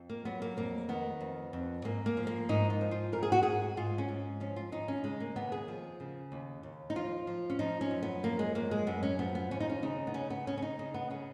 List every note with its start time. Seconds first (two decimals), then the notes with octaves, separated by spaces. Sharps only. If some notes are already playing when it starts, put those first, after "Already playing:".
Already playing: F2
0.10 A#3
0.25 F#3 B3
0.42 A#3
0.57 F2 A#3
0.89 D#3 B3
1.21 F2
1.53 F2
1.85 G#2 A#3
2.06 A#3
2.17 F3
2.27 A#3
2.49 G#2 D#4
2.70 F4
2.81 F3
2.91 F4
3.12 G#2 A#4
3.23 G#4
3.32 F#4
3.43 G#2 G#4
3.77 G#2 F4
3.98 C#4
4.09 G#2
4.40 F3 C#4
4.56 F4
4.72 D#2 D#4
4.88 C#4
5.04 C#3 G#3
5.20 A#3
5.36 D#2 B3
5.52 G#4
5.68 F3
6.00 C#3
6.32 D#2
6.63 D#2
6.90 D#4
6.96 F3 F4
7.27 F3
7.50 C#4
7.59 F3 D#4
7.81 C#4
7.91 F#2
8.03 B3
8.23 F3 A#3
8.39 G#3
8.55 F#2 A#3
8.71 G#3
8.87 F#2 B3
9.03 C#4
9.19 F3 B3
9.35 B3
9.51 D#2 C#4
9.60 D#4
9.70 C#4
9.83 C#3 D#4
10.07 B3
10.14 C#3 C#4
10.30 B3
10.47 C#3 C#4
10.58 C#4
10.62 D#4
10.79 C#3 D#4
10.94 B3
11.10 C#3 C#4